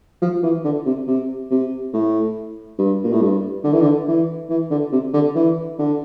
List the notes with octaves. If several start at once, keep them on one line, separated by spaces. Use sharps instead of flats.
F3
E3
D3
C3
C3
C3
A2
G2
A#2
A2
G2
D3
E3
D3
E3
E3
D3
C3
D3
E3
D3